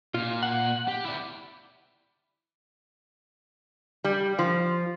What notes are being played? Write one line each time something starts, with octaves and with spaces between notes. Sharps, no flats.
A#2 F4
F#5
G4
E4 D5
G3
F3